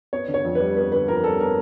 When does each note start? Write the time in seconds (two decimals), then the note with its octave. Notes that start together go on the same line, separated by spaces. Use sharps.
0.13 B3 C#5
0.28 D3
0.34 C#5
0.44 F2
0.55 G3 B4
0.76 B3 B4
0.92 D3 B4
1.08 F2 A#4
1.24 G3 A4
1.40 B3 A#4